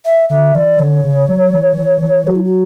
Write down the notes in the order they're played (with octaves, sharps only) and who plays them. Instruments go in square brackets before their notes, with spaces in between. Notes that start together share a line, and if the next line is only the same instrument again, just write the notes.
[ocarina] E5
[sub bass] D3 [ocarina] E5
[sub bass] E3 [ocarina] D5
[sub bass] D3 [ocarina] C#5
[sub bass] C#3
F#3
E3
E3
E3
[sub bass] F#3 [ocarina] F#4
[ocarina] E4
F#4